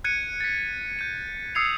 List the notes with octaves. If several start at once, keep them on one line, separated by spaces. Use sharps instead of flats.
F#6 G#6 C#7 D#7
A6 B6
G6 D#7
D#6 E6 G#6 C7 C#7 F7